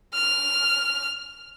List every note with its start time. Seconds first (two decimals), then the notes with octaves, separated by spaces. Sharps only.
0.15 F6